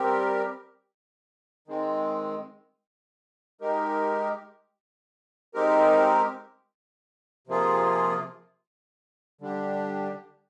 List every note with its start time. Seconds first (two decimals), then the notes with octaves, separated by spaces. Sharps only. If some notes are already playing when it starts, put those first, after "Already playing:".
Already playing: G3 C4 G4 A#4
1.68 D#3 G#3 C4
3.61 G#3 D#4 G4 A#4
5.54 G#3 C4 D#4 G4 A#4
7.47 C3 F3 A#3 F4 G#4
9.41 D3 G3 D4 G4